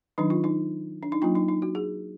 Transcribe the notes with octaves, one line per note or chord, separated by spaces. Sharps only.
D#3 F#3 D4 D#4
F4
D#4
D4
D#4
F#3 A#3 D4 F4
D#4
D#4
F#4
G#4